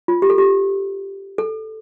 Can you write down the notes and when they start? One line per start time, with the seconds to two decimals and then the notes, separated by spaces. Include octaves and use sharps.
0.08 F4
0.22 G4
0.30 A4
0.38 G4
1.38 A4